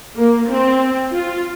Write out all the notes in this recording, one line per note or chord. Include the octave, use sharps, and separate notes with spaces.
A#3
C4
F4